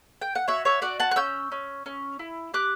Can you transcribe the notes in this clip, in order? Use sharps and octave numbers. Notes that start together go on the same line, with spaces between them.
G5
F#5
F#4 C#5 E5
C#5 E5
F#4 D5 F#5
F#5 A5
F#6
C#4 E6 G6
C#4
C#4
E4
G4 D6 F#6